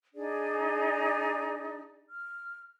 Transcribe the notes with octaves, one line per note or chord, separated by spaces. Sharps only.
D4 D#4 G#4 D5
F6